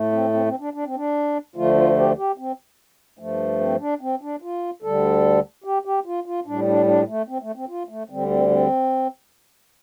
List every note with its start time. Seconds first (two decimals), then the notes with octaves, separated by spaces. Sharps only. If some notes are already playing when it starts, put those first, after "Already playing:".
Already playing: A2 A3
0.12 C4
0.33 C4
0.46 C4
0.60 D4
0.74 D4
0.85 C4
0.95 D4
1.55 D2 D3 F3 A3 F4
1.76 F4
1.96 G4
2.17 G4
2.38 C4
3.19 G2 F3 A3
3.60 C4
3.80 D4
4.01 C4
4.22 D4
4.42 F4
4.82 D2 D3 G3 A4
5.64 G4
5.85 G4
6.06 F4
6.26 F4
6.46 A2 G3 D4
6.67 D4
6.87 D4
7.08 A3
7.28 C4
7.42 A3
7.56 C4
7.69 F4
7.89 A3
8.09 D2 D3 G3 C4
8.30 C4
8.50 C4